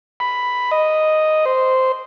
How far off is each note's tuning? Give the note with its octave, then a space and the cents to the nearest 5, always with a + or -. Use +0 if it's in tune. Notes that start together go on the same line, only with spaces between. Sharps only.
B5 +5
D#5 +0
C5 -10